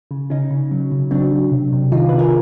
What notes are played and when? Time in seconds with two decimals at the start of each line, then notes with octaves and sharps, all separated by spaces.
0.11 C#3
0.30 C#3 C#4 D#4
0.50 C#3
0.71 F#3
0.92 C#3
1.11 F#3 C4 D4
1.32 F#3
1.52 C3
1.73 C3
1.92 D#3 D#4 F4
2.09 C3 B4
2.19 G#4 A#4